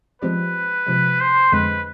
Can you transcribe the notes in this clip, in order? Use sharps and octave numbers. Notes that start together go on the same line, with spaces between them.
F3 G#3 C4 G4 B4 D5
C3 F3 G#3
C5
F2 D3 G#3 C4 B4